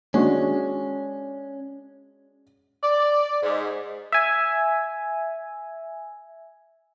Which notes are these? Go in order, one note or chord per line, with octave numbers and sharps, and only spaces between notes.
G#3 C#4 D4 F#4
D5
G#2
E5 G#5